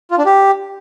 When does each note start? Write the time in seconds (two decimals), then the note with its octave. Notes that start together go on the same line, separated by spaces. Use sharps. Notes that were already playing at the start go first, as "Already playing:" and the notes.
0.11 F4
0.18 D4
0.26 G4